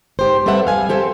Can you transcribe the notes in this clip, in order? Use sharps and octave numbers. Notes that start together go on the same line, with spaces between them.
G#2 G4 C5
G3 C4 A4 B4 E5 F#5
F5 G#5
C4 G4 A4 C5